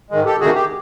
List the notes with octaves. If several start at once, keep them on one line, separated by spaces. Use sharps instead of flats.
G#2 D#3 G#3
G4 A4
D2 C3 D#3 F#4 G#4
G4